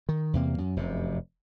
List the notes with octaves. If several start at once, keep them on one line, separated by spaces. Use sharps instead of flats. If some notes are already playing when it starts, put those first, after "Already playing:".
D#3
E2 C3 A#3
F#2
F1 F#2 C3